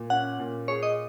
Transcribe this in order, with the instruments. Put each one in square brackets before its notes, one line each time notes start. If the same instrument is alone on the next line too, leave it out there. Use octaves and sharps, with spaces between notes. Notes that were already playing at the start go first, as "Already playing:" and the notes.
Already playing: [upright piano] A#2
[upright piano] C#4 [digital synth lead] F#5
[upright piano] A#2
[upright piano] G#4 [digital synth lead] C#5
[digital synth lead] D#5